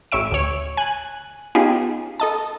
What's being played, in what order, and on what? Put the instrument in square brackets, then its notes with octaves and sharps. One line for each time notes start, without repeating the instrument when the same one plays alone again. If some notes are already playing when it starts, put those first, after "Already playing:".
[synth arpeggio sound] A1 C#5 E5 D7
D2 C#5
G#5 F#6
B3 C#4 D#4 F4 G4 G#4
A4 D#5 A5